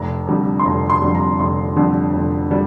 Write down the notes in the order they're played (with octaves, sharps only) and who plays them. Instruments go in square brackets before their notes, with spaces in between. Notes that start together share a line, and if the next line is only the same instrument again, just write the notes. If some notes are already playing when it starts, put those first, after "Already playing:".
Already playing: [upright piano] F1 A#5
F2 D3 G3
C6
F1 A#5
C6
F2 D3 G3
A#5
F1 C6
F2 D3 G3
F1
D3 G3